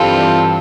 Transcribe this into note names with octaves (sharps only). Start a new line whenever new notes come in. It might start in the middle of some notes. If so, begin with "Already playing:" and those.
Already playing: G2 E3 G3 C4 F4 A4